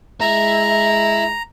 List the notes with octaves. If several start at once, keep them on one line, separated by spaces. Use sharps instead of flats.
G#3 E4 A#5